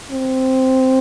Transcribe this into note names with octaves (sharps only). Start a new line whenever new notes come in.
C4